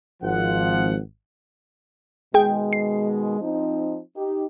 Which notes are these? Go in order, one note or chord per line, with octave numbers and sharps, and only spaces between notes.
G#1 F3 F#5
B2 D#3 G#3 G#4 G5
C7
F3 C4 D#4
D#4 G4